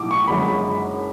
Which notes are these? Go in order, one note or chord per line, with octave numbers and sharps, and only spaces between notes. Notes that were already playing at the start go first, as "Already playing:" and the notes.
Already playing: B1 A2 E3 D6
C#6
F#1 F#2 D3 G#3 B5